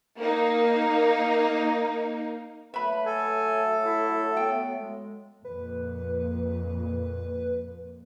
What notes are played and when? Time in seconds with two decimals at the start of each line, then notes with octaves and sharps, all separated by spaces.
0.18 A#3 D#4
2.74 F#3 A3 B4 E5 B5
3.06 A4 G#5
3.83 E4
4.37 B3 G5
4.77 G#3
5.45 F2 A#2 B4